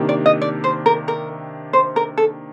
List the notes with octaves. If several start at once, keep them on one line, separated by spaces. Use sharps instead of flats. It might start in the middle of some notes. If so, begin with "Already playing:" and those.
Already playing: C3 D#3 A#3 D4 G4
D5
D#5
D5
C5
A#4
A#4
C5
A#4
A4